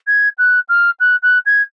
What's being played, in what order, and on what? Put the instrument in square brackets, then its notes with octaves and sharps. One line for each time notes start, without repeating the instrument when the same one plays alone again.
[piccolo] G#6
F#6
F6
F#6
F#6
G#6